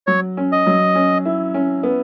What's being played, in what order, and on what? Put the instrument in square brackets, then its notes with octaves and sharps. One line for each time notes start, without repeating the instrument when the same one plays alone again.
[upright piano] F#3 [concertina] C#5
[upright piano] C#4
[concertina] D#5
[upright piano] F#3
C#4
E4
C#4
B3